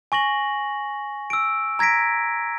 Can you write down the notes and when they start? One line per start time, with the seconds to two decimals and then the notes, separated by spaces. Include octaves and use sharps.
0.12 G#5 C#6 A#6 F#7
1.30 E6 D7
1.79 A#5 G#6 A#6 B6 D7